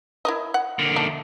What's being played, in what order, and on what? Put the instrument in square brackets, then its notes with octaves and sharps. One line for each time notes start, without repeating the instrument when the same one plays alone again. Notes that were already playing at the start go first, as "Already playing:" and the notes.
[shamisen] E4 A#4 D#5
F#5
[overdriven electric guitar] D3 A#3
[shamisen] A3 D4 D#4